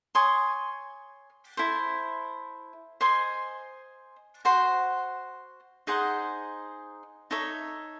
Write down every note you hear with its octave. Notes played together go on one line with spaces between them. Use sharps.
C#5 G#5 C6 D#6
E4 A4 C5
C5 D#5 G#5 C6
F#4 C5 F#5 C6
D#4 G#4 C5 F#5
D#4 A4 C#5 E5